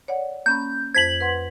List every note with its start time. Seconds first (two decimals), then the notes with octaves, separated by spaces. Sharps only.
0.08 C#5 D5 F#5
0.46 A#3 C#4 B5 G6
0.94 F2 C5 G#6 B6 F#7
1.21 B4 F#5 C6